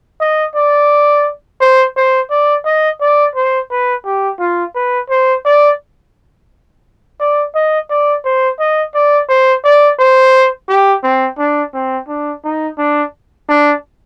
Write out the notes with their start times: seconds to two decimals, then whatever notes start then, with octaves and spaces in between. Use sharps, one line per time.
0.20 D#5
0.55 D5
1.61 C5
1.96 C5
2.30 D5
2.65 D#5
3.01 D5
3.35 C5
3.71 B4
4.05 G4
4.40 F4
4.75 B4
5.10 C5
5.45 D5
7.20 D5
7.55 D#5
7.90 D5
8.25 C5
8.60 D#5
8.95 D5
9.29 C5
9.64 D5
9.99 C5
10.69 G4
11.03 C4
11.38 D4
11.74 C4
12.08 D4
12.44 D#4
12.78 D4
13.49 D4